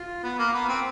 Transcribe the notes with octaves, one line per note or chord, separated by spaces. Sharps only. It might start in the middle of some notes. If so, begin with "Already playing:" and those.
Already playing: F4
B3
A#3
B3
C4